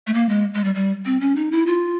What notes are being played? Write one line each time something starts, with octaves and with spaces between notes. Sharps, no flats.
A3
A#3
G#3
G#3
G3
G3
C4
C#4
D#4
E4
F4